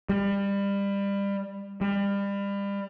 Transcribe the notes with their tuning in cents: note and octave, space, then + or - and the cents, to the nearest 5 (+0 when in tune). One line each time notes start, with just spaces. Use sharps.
G3 +25
G3 +30